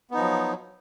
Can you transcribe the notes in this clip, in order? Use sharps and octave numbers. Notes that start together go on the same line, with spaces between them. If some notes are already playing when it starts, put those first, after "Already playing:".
F3 F#3 B3 D#4